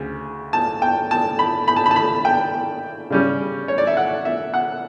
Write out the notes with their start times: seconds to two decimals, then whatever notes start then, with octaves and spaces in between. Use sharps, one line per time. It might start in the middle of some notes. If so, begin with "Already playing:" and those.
Already playing: D2 C#3
0.53 A5
0.82 G5
1.11 A5
1.39 B5
1.68 B5
1.76 A5
1.86 B5
1.91 A5
1.96 B5
2.25 G5
3.10 C#3 G3 C#4
3.68 C#5
3.78 D5
3.87 E5
3.97 F#5
4.25 E5
4.54 F#5